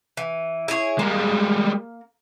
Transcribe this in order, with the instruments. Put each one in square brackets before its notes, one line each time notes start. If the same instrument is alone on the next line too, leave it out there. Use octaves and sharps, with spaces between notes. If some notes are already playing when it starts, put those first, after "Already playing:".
[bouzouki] E3
E4 G#4 C#5
[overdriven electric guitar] G3 G#3 [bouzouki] A#3